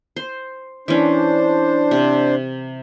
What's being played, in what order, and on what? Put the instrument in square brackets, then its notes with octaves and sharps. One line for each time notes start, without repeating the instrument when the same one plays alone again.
[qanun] C5
[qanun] E3 C#4 [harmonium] D4 C5
[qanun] C3